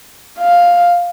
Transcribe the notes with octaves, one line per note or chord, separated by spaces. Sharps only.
F5